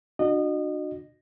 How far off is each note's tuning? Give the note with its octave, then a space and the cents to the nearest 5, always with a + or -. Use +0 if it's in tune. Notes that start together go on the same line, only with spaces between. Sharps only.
D4 +30 F#4 -20 D#5 -30